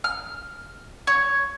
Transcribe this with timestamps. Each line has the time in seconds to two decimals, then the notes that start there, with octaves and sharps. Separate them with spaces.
0.04 F6
1.07 C#5